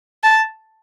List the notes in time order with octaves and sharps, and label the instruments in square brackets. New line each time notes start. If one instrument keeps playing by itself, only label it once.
[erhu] A5